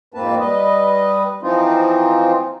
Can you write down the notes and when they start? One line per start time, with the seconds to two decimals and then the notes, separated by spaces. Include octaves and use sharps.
0.14 F2 G#2 A#3 C4 B4 A5
0.39 G3 B4 D#5
1.43 E3 F3 C4 D#4 F4